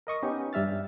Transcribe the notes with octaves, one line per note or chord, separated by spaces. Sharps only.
A#4 D#5 C#6 D#6
B3 C#4 D#4 G4
G2 G3 E5 F6 A6